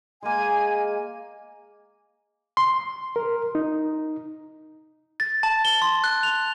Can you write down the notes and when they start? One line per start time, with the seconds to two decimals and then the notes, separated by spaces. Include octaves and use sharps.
0.23 G#3 A#3 G#5
2.57 C6
3.16 A#4
3.55 D#4
5.20 A6
5.43 A5
5.65 G7
5.82 C6
6.04 F#6
6.23 F7